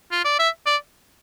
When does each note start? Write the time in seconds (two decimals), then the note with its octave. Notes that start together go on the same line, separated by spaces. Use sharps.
0.11 F4
0.25 D5
0.39 E5
0.66 D5